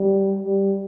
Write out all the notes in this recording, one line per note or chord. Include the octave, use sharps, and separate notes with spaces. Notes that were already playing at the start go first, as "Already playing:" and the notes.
Already playing: G3
G3